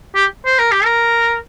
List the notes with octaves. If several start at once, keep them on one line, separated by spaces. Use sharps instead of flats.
G4
C5
A#4
G4
A#4